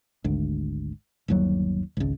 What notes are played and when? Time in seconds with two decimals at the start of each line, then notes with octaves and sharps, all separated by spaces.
0.24 G#1 D2
1.28 G1 D#2 F#3
1.97 G#1 C#2